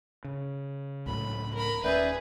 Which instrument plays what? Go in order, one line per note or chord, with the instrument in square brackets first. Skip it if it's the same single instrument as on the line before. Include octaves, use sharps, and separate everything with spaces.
[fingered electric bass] C#3
[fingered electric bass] C#2 A2 F#3 [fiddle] B5
[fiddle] A#4 B5
[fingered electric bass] D#1 C4 C#4 [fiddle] G#4 B4 [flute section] D5 E5 G6